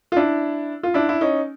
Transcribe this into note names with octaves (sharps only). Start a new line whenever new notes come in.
F4
D4 E4
F4
D4 E4
E4
C#4 D#4